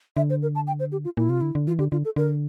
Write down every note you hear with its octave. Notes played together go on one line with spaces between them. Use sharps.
D3 E5
C5
A#4
A5
G5
C5
G4
F4
A#2 E4
C3 F4
D3 E4
D3
E3 F4
D3 G4
D3 F4
A4
D3 A#4